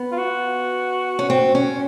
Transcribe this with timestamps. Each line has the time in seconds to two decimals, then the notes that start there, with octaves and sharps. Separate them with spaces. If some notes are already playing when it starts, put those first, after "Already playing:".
Already playing: B3
0.12 F4
0.17 F#4
1.19 C#4
1.30 C4
1.55 C#4